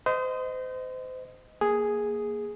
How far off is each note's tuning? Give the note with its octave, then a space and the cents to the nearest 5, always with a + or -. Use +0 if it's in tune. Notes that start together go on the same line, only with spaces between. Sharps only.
C5 -35 D#5 +0
A#3 +0 G#4 +0